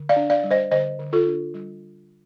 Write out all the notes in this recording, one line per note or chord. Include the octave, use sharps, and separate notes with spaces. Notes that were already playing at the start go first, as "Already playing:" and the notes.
Already playing: D3
D5 F5
D4
D5 F5
G3
C5 D#5
D3 C5 D#5
D3
F4 A4
D4
G3